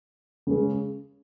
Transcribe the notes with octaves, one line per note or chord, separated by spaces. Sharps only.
C#3 G#3 C#4 G#4